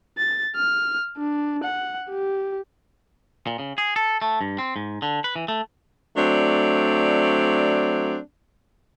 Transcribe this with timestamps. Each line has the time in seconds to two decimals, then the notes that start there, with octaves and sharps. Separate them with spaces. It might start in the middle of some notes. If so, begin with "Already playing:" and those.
0.18 A6
0.56 F6
1.17 D4
1.63 F#5
2.10 G4
3.47 A#2
3.59 C#3
3.78 G#4
3.96 A4
4.22 A3
4.41 G2
4.58 C4
4.76 G#2
5.02 D3
5.24 B4
5.36 E3
5.48 A3
6.17 F#3 A3 C4 D4 D5